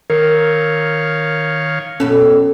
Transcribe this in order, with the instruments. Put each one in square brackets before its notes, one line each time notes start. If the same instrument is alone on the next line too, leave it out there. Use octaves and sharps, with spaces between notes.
[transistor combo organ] D#3 C#5 F5 [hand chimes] A#4
[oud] F#2 B2 A4 [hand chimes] C#4